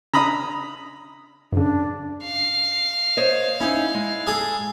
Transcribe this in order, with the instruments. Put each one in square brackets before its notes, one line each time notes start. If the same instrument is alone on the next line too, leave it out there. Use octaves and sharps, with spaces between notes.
[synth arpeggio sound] C#3 D4 [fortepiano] A#5 B5 D#6
[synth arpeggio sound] F#2 C#3 [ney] D4
[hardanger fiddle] F5
[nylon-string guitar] C5 C#5 D#5
[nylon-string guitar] C#4 D#4 [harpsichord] E4
[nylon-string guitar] G#3
[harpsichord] G#4 A4 D#6